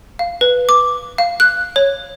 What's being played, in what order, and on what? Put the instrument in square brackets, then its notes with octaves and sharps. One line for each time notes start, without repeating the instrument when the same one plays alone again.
[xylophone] F5
B4
D6
F5
F#6
C#5